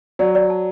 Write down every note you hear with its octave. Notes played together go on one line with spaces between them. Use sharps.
F#3 D5
D5
A5